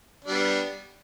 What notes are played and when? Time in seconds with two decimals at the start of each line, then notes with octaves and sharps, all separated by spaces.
0.25 D4
0.28 G3
0.31 B3